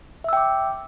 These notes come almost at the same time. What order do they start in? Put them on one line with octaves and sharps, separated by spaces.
E5 E6 G5 D6